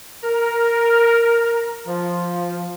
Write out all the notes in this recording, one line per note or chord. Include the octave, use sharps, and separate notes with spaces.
A#4
F3